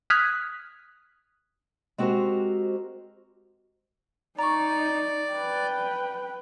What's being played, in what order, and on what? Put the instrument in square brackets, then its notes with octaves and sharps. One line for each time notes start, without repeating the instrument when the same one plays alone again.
[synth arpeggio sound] D#6 F6 F#6 G#6 B6
[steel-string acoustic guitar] G#3 C4 F#4 G4 A#4 C5
[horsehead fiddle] D#4 [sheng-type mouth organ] D5 [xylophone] A#5 C#6
[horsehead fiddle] B4 G5